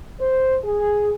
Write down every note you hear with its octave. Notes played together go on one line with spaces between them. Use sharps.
C5
G#4